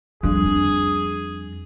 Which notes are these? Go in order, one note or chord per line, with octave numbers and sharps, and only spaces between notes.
F2 G3 D4 G#4